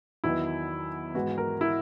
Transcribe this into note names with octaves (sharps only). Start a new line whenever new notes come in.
E2 D#3 F#3 B3 E4
G#2 E3 G#3 B3 F#4
A#4
E4